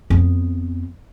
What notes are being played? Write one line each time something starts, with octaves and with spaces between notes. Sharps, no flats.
F2 B3